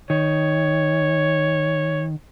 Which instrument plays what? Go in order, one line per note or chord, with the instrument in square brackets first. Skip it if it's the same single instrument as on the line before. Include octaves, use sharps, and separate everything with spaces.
[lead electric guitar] D#3 [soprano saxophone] C#5